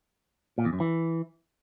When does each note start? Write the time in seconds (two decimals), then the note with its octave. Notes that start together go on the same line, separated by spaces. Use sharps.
0.58 A#2
0.65 E2
0.73 F#2
0.80 E3